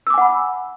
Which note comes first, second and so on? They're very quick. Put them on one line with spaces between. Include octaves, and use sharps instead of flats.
E6 D6 G#5 F#5 B5